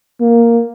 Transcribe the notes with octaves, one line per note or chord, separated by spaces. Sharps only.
A#3